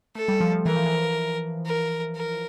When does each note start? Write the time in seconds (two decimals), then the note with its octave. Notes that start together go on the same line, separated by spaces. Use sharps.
0.15 A3 A4
0.28 G3
0.41 F3
0.53 F3
0.66 E3 A#4
0.76 F3
0.86 E3
1.66 A#4
2.16 A#4